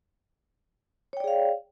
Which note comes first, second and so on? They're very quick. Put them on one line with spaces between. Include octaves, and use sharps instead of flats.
C#5 G5 D5 G#4 F5